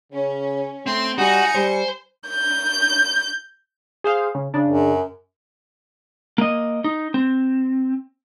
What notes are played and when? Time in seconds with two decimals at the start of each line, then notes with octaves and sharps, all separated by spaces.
0.12 C#3 C#4
0.86 A3 C4 C6
1.18 G3 D#4 F#4 G#5 C#7
1.55 G3 C5
2.29 G6
4.04 G#4 C5 F5
4.35 C#3
4.54 C#3 D4
4.68 F#2
6.38 A#3 D#5
6.84 D#4
7.14 C4